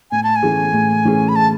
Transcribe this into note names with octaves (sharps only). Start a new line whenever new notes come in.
A2 G#5
A5
G#5
E3 A3 C#4 G#4
A2
E3 A3 C#4 G#4
B5
A5